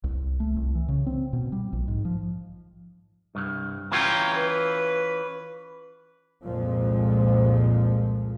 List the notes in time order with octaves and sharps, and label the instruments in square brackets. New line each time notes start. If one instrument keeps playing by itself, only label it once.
[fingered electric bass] C2
A3
C2
E3
C#3
C4
B2
G3
A#1
G#2
F3
[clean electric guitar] C2 G2
[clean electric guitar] E3 C#4 F4 [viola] G5 A#5
[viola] B4
[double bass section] C2 F2 A#2 F3 G#3